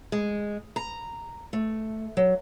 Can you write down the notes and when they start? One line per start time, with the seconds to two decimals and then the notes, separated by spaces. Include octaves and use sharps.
0.12 G#3
0.76 A#5
1.53 A3
2.17 F#3